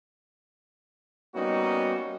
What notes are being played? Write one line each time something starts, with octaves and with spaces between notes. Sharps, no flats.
G3 A#3 B3 C#4 D#4 F#4